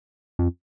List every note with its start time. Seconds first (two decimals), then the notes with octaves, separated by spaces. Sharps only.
0.39 F2